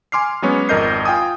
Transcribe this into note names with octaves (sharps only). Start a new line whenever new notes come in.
G#5 C6 D6 F6 C7
F#3 G#3 B3 C#4 C#5
G#1 F2 A#4 D#5 G6 C7
F4 G5 G#5 D#6